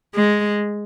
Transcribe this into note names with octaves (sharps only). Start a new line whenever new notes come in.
G#3